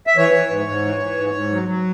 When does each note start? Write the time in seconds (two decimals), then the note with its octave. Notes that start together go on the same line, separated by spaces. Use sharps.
0.07 E5
0.17 E3 C#5
0.34 E3
0.50 G#2
0.67 G#2
0.85 E3
1.01 E3
1.18 G#2
1.34 G#2
1.52 F#3
1.68 F#3